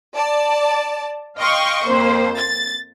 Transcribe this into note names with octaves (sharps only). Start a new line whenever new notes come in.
D5 A5
D#5 F5 G5 C6 C#6
F2 A#3 C5
A6